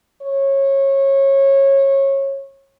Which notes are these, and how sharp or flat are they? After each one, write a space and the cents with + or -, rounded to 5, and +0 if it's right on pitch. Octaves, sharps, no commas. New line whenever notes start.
C#5 -20